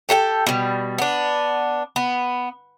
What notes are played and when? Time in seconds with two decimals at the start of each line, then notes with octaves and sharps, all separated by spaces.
0.09 G4 A4 F#5 G5
0.47 B2 G3
0.98 B3 D4
1.96 B3